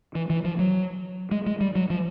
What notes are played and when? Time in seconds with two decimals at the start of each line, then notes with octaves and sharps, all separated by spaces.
0.15 E3
0.30 E3
0.45 F3
0.59 F#3
1.31 G#3
1.46 G#3
1.61 G3
1.75 F#3
1.90 F3